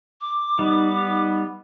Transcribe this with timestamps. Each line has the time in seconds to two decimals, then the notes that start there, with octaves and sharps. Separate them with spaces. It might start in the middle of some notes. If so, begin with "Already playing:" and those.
0.21 D6
0.59 G3 B3 D#4
1.07 D#4